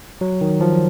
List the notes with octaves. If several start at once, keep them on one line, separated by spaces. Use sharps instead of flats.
F#3
D#3
F3